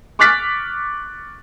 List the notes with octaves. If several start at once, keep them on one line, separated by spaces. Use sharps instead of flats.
C#6 D6 F6 F#6 A6 B6